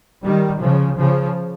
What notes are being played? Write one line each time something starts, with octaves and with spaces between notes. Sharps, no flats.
D#3 G3
C#3 F3
C#3 F3